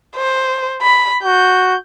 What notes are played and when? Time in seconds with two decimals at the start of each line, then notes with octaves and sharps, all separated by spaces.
0.16 C5
0.82 B5
1.23 F#4 G6